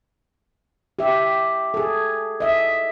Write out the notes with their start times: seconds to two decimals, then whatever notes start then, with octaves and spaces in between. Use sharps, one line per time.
0.99 G4 E5
1.74 G#4 A4
2.40 D#5 E5